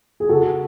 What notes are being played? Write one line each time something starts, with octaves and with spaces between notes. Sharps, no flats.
G#4
C#3 F#4 A4